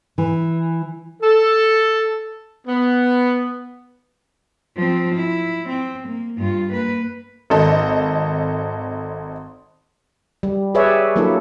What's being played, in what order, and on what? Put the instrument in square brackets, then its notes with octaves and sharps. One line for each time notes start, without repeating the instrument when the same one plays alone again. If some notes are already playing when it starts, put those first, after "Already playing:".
[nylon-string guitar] E3
[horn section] A4
B3
[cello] F3 C4
E4
C4
A#3
G2 F4
A#3 B4
[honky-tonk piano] G#1 A4 D#5
[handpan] G3
G4 G#4 B4 C#5 D5 E5
F#3 A#3 D4 E4 A4